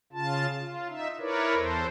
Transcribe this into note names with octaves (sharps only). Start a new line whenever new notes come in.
C#3 F4 A5
F4
D#4 E5
E4 A#4 B4 C#5 D5
E2 A4 C5